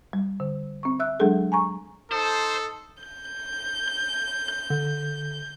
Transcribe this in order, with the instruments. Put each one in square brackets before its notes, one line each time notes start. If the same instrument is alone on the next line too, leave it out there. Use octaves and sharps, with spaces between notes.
[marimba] G3
D3
C4 C#6
E5 E6 F#6
F#3 G#3 D4 G#4 A4
G#5 A#5 C#6
[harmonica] D#4 D#6 [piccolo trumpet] A4 [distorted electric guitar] C5
[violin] G6
[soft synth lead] D3